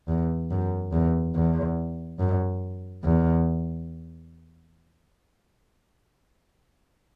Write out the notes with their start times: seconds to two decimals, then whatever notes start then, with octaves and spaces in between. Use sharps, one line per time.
0.08 E2
0.51 F#2
0.93 E2
1.35 E2
2.20 F#2
3.04 E2